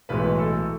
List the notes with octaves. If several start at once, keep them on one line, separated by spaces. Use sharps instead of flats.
B1 A2 E3 G#3 B4
A4